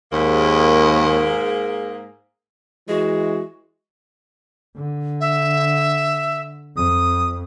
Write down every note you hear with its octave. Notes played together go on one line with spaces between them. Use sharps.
D#2 G#2 A#3 G#4
E3 G#3 F#4
D3
E5
F2 D#6